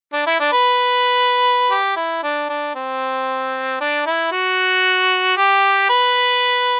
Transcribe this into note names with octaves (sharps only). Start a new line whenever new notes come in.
D4
E4
D4
B4
G4
E4
D4
D4
C4
D4
E4
F#4
G4
B4